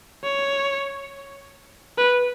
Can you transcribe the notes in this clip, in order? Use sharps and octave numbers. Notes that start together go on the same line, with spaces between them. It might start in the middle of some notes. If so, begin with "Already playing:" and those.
C#5
B4